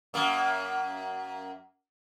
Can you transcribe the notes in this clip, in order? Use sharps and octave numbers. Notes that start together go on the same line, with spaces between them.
F#2 A#3